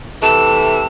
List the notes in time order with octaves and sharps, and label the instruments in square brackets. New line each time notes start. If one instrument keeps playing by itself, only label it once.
[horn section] C3 E3 A3 [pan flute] A5